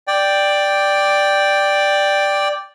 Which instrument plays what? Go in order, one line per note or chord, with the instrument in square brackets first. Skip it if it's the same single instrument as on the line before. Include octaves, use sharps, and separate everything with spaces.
[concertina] D5 G5